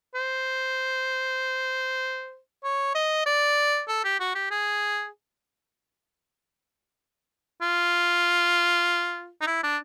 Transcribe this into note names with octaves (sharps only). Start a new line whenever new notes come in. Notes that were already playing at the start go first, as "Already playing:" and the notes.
C5
C#5
D#5
D5
A4
G4
F#4
G4
G#4
F4
D#4
E4
D4